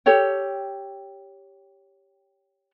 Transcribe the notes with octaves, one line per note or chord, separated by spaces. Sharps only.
G4 A4 C#5 G5